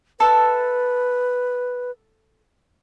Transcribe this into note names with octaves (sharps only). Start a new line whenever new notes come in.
A4 B4 E5 A5